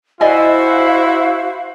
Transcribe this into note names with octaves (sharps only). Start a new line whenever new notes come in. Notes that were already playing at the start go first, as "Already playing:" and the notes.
E4 F#4 C5 D5 D#5 F5 G#5